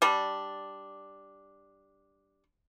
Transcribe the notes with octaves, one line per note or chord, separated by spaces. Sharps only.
G3 D4